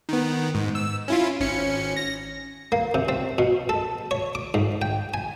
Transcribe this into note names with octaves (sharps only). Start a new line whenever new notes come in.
D#3 B3
G#2
E6
C#4 E4 F4
G#1 C#4 C#7
A#6
A#3
C3
C4
B2
A4
C#5
D6
G#2
G5
G#5